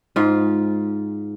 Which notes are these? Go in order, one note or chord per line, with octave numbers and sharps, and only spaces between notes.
G#2 F4